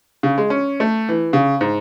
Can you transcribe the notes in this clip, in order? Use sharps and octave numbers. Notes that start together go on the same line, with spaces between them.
C#3
G#3
C#4
A3
E3
C#3
G#2